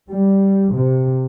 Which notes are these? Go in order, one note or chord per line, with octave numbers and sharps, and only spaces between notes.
G3
C3